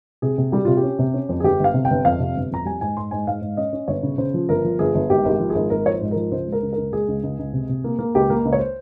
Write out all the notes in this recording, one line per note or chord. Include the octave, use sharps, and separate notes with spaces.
C3 G#4
C3
G3 G4
C3 F4
G4
C#4
C3
C#4
F2
G#4
G1 G4
G1 F5
C3
G5
G1
F2 F5
C3
G1
F2 A#5
G3 G#5
G#2 G#5
G#2 C6
G#2 G#5
G#2 F5
G#2
C#4 D#5
C#4
G1 C#5
C#3
C#3 C5
F3
G1 A#4
F3
G1 G#4
G1
G#1 G4
G#1 G4
F3
G#4
G#1
G#1 A#4
F3 C#5
C5
G#2
F3 A#4
C#2 C5
G#3
A#4
C#2
C#2 A#4
G#3 G#4
C#2
C#2
C#2
C3
C3
A#3
A#3
C#2 G4
A#3
C#2
C#5
C5